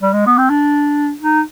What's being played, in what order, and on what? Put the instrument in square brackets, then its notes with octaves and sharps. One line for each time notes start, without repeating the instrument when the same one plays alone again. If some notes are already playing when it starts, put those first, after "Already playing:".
[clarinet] G3
G#3
B3
C4
D4
D#4